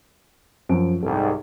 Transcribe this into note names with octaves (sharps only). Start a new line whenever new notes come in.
F#2 F3 D7
C2 G#2 A4